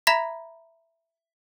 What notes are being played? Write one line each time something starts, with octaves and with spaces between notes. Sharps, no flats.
E5 A#5 B5 G#6 A#6 B6